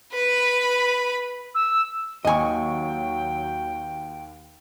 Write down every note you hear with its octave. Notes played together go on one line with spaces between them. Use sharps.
B4 B5
E6
D#2 F#3 D#5 G5 G#5 C#6